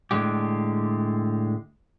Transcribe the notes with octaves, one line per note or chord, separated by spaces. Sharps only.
A2 D3 G#3 G4